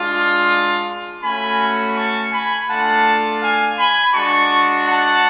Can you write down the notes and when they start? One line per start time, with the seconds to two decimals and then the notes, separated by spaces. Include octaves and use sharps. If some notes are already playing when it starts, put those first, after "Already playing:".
Already playing: G#3 D4 F4
1.22 A3 C#4 F#4 G#5 B5
1.95 A5 C#6
2.31 G#5 B5
2.67 A3 D4 F4 F#5 A5
3.40 F5 G#5
3.78 G#5 B5
4.13 G#3 D4 F#4 A5 C#6
4.86 F#5 A5